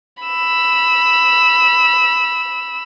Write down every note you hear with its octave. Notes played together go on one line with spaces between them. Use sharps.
B5 E6